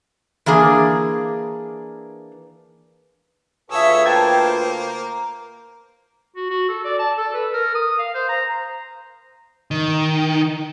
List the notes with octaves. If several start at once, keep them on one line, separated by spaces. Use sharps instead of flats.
E3 A#3 D4 G#4
D2 F4 G#4 A4 B4 C#5 E5 E6
A#3 C5 G5 A5 G#6
F#4
F#4
A4
D5
A5
A4
B4
A#4
D#6
F5
C5
A#5
D#3